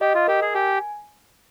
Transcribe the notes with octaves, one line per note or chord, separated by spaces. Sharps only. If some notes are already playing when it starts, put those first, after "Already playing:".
G4 D#5
F4
G4 A#4
G#4
G4 G#5